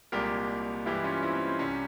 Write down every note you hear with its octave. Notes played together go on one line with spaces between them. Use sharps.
C2 A#2 G#3 G4 A#4
G2 E3 G#3 E4 G4
C#4 F4
C4 E4
C#4
C4
C2 C3 G3 C#4